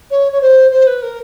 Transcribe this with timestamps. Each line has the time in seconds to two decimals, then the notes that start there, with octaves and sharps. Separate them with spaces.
0.10 C#5
0.32 C#5
0.41 C5
0.71 C5
0.86 B4
1.02 A#4